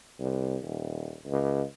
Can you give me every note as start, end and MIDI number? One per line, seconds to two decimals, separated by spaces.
0.20 0.57 36
0.62 1.15 27
1.26 1.63 37